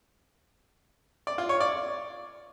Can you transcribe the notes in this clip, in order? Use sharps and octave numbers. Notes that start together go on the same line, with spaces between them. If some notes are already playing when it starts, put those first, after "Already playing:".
D5
F4
C#5
D5